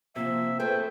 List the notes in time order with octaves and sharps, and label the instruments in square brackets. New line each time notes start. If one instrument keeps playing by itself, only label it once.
[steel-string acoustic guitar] C3 [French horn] F3 [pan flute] A#3 [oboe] E5
[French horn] A3 [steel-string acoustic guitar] G#4 B4 C5 [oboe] G5